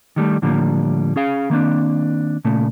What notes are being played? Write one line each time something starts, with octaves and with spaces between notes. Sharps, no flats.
D#3 G3 A3
A2 D3 F3 G3 A3 A#3
C#4 G#4 F5
D#3 A#3 C4 D4
A#2 C#3 A3